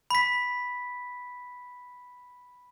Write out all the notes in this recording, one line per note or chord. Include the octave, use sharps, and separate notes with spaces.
B5 B6